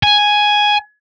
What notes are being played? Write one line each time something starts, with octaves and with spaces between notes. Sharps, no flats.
G#5